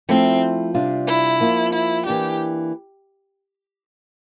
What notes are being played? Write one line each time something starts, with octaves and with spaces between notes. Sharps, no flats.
F3 A3 C4 E4
C3 G3 D4 F4
E4
F3 A#3 F4
E4
E3 A#3 D4 G4